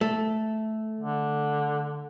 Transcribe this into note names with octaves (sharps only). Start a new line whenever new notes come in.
A3
D3